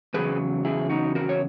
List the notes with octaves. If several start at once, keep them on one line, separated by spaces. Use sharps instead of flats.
E2 C#3 F#3 G#4 B4
E4 G#4
D#4 F#4
F#4 A#4
C#5